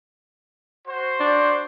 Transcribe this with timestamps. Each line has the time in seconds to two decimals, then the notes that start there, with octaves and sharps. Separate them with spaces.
0.87 F#4 C5
1.20 D4